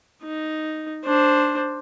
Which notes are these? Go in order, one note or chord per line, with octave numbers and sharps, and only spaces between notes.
D#4
D4 C5